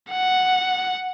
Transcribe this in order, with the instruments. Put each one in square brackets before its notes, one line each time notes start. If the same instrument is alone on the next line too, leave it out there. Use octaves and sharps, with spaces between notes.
[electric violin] F#5